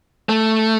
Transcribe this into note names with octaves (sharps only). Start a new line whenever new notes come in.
A3